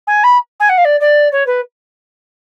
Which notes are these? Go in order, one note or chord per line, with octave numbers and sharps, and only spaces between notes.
G#5
B5
G#5
F#5
F5
D5
D5
C#5
B4